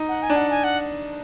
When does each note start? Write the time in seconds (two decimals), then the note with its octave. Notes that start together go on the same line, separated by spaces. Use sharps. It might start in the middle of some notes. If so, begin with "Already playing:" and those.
Already playing: D#4
0.09 F#5
0.22 G#5
0.30 D4
0.36 F#5
0.50 G#5
0.64 F#5